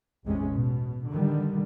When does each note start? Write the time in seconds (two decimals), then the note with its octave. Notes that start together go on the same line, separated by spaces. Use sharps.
0.25 A1 E2 C3 G#3 C#4
0.54 B2
1.09 D3 D#3 G3